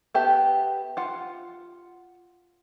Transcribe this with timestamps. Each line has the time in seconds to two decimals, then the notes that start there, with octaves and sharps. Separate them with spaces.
0.15 B3 G4 E5 A5
0.97 F4 F#5